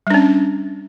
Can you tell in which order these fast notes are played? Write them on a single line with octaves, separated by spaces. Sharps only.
G3 D4 C#4